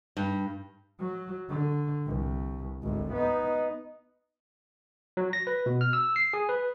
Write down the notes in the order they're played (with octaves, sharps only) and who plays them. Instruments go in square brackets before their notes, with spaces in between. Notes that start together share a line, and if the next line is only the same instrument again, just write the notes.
[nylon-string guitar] G2
[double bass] F#3
D3
C2
G#1 D2
B3 D#4
[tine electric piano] F#3
A#6
B4
B2
F6
E6
C7
G#4
B4